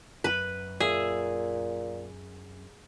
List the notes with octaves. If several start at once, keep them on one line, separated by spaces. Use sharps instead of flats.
F#2 B4
A#2 G#4 E5